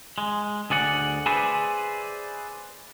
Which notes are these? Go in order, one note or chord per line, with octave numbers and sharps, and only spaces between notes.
G#3
D2 G#4 D5 F#5
G#4 B4 C5 D5 E5